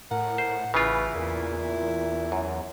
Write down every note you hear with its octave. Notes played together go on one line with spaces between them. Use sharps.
A2 A#4 F#5
C5
A1 C#3 E3 E4 F4 B4
E2 A#2
F#2